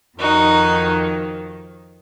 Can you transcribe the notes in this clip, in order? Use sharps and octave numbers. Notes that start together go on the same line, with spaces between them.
F2 D#3 D#4 F#4